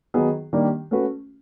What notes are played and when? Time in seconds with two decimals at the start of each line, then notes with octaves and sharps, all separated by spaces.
0.14 D#3 F#3 B3 D#4 G#4
0.53 D#3 G3 A#3 D4 G4
0.91 A3 C#4 F#4 B4